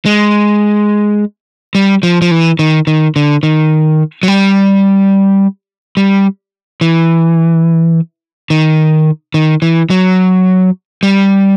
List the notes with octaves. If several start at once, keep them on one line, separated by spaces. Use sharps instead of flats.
G#3
G3
F3
F3
E3
D#3
D#3
D3
D#3
F#3
G3
G3
E3
D#3
D#3
E3
F#3
G3